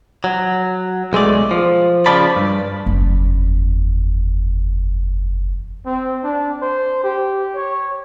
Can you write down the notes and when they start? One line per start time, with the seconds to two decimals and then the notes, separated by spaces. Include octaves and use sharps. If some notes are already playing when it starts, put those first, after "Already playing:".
0.24 F#3
1.13 B1 G#3 A3 D5
1.51 F3
2.06 C#3 F3 D5 A5 B5
2.36 G2
2.86 F#1 E2
5.85 C4
6.24 D4
6.62 C5
7.03 G4
7.55 C#5